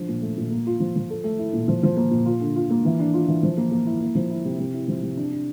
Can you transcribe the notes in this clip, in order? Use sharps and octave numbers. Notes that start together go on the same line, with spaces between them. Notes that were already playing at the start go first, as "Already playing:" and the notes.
Already playing: F3 D4
A#2
A3
A#2
A#3
F4
F3
F3
A4
A3
E4
A#2
F3
F3
A#3
A#2
F4
D3
F4
A#3
E3
D4
F4
E3
F3
A#3
A#3
E4
A#3
F3
E4
C3
C3
E4
F3
C3
D4
D4